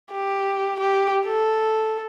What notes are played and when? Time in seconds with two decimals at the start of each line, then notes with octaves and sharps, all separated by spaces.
0.12 G4
0.79 G4
1.26 A4